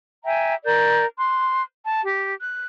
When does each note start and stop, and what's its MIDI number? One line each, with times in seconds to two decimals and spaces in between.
0.24 0.55 76
0.24 0.55 79
0.24 0.55 80
0.24 0.55 82
0.66 1.04 70
0.66 1.04 74
0.66 1.04 91
1.18 1.62 84
1.18 1.62 90
1.86 2.01 81
2.04 2.34 67
2.41 2.67 90